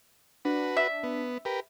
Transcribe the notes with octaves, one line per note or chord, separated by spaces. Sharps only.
D4 F#4 B4
E5
B3
G4 A#4 B4